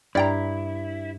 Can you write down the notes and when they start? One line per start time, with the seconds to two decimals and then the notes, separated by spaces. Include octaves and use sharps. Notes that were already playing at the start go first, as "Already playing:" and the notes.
0.15 G2 E4 D5 G5 A#5